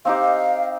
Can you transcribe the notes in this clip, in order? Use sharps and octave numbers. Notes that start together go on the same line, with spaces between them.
C4 D#4 G4 F5